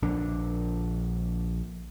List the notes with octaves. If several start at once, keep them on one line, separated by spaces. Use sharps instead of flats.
A#1 D3 D4